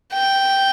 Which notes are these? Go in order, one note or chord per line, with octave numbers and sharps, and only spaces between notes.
G5